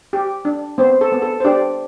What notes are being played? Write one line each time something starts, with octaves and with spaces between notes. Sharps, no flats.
G4
D4
B3 C4 C5
A4
B3
A4
C5
D4 G4 D5